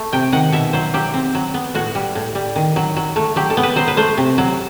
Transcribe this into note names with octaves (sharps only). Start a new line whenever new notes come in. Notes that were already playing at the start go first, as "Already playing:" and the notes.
Already playing: A3
C3 G5
D#3 F#5
B2 E5
F#3 C5
F#3 G4
C4
F#3
B3
A2 F#4
G3
A2
G3
D#3
F#3
F#3
A3
F#3 G4
A4
B3
B4
F#3 C5
B4
A3 C5
C3
F#3